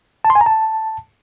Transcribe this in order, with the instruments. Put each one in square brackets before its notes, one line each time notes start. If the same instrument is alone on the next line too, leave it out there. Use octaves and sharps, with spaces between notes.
[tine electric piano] A5
C6
G#5
A#5
A5